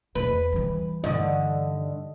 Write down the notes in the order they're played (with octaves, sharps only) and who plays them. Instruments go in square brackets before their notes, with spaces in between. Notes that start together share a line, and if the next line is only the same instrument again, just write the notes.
[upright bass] E2 B3 [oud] B4
[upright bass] E3 G3
[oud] G2 D3 [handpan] D#5